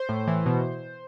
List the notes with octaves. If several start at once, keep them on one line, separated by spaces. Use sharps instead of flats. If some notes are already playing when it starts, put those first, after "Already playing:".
Already playing: C5
A2
E3
B2